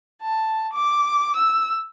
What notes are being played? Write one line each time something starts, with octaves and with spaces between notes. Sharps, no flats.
A5
D6
E6